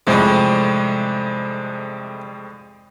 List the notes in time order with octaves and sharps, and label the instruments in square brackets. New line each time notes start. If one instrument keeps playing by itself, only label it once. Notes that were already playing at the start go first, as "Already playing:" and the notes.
[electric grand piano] F2 A2 G#3 [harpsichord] C3 G3